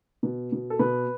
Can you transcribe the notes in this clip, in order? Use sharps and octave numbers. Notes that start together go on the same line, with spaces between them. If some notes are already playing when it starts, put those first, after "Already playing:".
B2
B2
A4
B2 B4